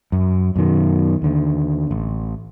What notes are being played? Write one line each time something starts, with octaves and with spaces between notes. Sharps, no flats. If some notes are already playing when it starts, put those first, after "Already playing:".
F#2
F#2 B2 D#3
D#2 D3
A1